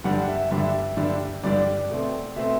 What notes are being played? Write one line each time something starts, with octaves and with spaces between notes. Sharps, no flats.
G2 D3 G3 D4 F#5
E5
G2 D3 G3 D4 E5
G2 D3 G3 D4
G2 D3 G3 D4 D5
B2 A3 C4
B2 A3 C4 E5